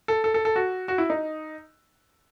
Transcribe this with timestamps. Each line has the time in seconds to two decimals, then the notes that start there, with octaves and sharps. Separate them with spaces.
0.08 A4
0.24 A4
0.34 A4
0.45 A4
0.56 F#4
0.88 F#4
0.98 E4
1.10 D#4